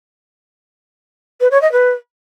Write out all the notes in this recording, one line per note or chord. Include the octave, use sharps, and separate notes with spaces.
B4
C#5
D#5
B4